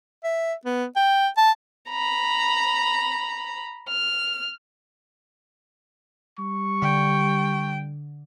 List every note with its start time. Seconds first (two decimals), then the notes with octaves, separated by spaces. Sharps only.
0.24 E5
0.65 B3
0.96 G5
1.37 A5
1.90 A#5 B5
3.89 F6
6.39 G3 C#6
6.82 D3 G5